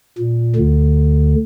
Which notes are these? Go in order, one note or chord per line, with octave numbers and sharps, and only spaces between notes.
A#2
D2 D3